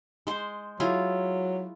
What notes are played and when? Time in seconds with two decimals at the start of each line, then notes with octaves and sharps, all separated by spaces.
0.27 G#3 C5
0.80 F#3 E4 F4 G#4